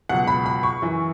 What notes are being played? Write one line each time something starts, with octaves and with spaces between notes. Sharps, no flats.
C#2 B2 F#3 F#5
B5
B5
C#6
F#2 E3